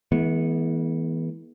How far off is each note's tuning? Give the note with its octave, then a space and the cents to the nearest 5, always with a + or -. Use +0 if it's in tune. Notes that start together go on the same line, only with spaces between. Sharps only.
E3 -25 G#3 +30 B3 -25